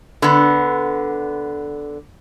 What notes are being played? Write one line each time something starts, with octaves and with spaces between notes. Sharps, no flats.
D3 B3